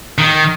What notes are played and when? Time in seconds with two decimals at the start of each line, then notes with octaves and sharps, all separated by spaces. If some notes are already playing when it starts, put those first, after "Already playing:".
0.18 D#3